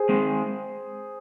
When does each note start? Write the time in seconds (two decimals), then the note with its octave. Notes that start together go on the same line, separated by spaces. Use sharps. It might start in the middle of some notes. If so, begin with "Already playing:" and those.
Already playing: G#4 C5
0.09 G#3 C4